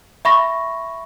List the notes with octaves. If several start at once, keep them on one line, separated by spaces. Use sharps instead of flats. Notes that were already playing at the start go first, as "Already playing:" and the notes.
E5 B5 C#6 A#6